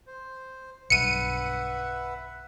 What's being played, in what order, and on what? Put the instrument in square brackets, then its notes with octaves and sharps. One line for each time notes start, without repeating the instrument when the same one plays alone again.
[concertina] C5
[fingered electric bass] B1 G2 [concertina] B4 E5 F#5 [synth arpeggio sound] C#7 D#7